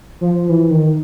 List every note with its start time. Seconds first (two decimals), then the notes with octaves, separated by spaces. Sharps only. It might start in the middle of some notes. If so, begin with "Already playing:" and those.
0.21 F3
0.49 E3
0.70 D#3